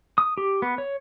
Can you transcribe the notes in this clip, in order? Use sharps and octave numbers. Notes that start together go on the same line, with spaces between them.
D#6
G4
B3
C#5